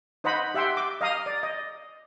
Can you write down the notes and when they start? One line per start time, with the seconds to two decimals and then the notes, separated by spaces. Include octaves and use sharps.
0.24 D#4 C5 D#5 F#5 B5
0.54 G4 E5 F#5 G5 C6
0.77 D6
1.01 D#5 F5 A#5 D#6
1.26 D5
1.43 D#5